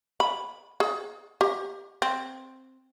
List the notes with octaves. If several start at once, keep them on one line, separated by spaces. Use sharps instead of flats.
B5
G#4
G4
C4